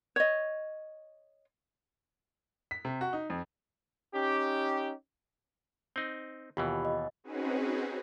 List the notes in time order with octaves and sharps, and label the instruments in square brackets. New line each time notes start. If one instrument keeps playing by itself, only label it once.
[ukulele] C#5 D#5
[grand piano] B6
C3
F#4
D#4
F2
[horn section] C#4 D#4 G4
[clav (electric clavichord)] C4 D#4
[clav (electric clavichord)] D#2 B2 E3 [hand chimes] F4 G4 B5
[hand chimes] D#5
[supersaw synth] C4 C#4 D#4 F#4 G#4 B4